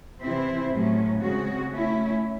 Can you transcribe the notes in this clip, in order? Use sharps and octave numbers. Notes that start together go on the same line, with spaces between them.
C3 E3 C4 E4 C5
A2 F#3 C#4
C#3 G#3 C4 F#4
A3 C#4 E4